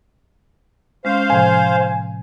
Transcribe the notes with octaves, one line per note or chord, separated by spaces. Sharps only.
G#3 C#4 C5 F5
A2 C3 F3 G#5